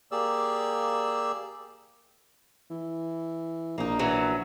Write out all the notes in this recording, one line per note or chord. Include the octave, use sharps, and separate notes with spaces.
A#3 G4 G#4 D5 E6
E3
A#1 A#3 D#4
E3 F#3 C#4